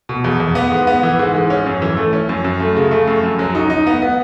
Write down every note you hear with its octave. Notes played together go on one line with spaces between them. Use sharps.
B2
E2
E2
B3
G#2
B3
E3
G#2
G#2
C#4
F#2
E3
A3
C#4
F#2
F#2
A3
C#3
A3
F#2
F#2
F#3
D#4
D#4
B3
B3